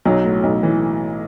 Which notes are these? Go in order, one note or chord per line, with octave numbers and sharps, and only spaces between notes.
B1 F#3
A2
B1
E3